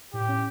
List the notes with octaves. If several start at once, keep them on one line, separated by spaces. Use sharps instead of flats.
A2 G4
C#4